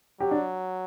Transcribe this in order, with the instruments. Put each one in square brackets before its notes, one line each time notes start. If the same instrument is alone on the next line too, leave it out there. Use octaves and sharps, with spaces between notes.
[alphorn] F#3 [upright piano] G4
[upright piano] D4